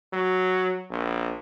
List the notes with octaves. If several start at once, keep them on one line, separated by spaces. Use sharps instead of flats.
F#3
A#1